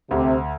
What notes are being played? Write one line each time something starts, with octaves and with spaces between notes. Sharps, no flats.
D2 C3